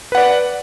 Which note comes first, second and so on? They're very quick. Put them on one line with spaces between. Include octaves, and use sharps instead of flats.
B4 F#5 D5